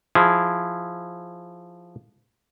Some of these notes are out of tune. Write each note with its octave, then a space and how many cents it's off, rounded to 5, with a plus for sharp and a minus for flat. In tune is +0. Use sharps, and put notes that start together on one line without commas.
F3 +0 E4 +0 G#4 +0